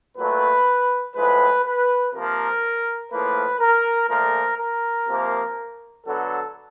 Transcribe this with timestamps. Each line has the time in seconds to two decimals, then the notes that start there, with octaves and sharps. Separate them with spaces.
0.17 A#2 F#3 A3 B4
1.15 A2 F3 G#3 B4
1.64 B4
2.13 C3 F3 A#3 A#4
3.11 A2 F3 A#3 B4
3.61 A#4
4.09 A#2 F3 A3 A#4
4.59 A#4
5.07 C3 F3 A#3
6.06 D3 F#3 B3 A4